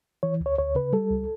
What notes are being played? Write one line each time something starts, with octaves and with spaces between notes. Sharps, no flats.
E3 C#5
D2
C#5
D2 C#5
C#3 B4
G3 A4
C#2